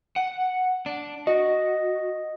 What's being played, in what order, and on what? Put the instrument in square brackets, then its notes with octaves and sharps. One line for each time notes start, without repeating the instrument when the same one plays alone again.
[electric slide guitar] F#5
D4
[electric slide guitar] F#4 [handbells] D#5